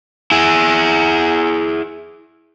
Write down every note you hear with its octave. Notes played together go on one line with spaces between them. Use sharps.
E4 G#4